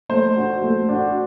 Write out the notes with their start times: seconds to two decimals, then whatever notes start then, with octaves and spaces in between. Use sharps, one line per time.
0.09 A3 C5
0.36 D4 F#4
0.62 A3
0.89 D4 F#4